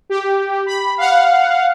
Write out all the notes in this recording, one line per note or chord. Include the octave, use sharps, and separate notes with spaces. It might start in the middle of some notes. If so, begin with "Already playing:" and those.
G4
B5
F5 F#5